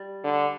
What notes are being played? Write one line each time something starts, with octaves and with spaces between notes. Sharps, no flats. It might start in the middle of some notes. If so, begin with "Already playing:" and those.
Already playing: G3
D3